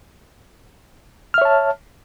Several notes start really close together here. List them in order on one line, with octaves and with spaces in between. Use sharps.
F6 E5 C#5 A5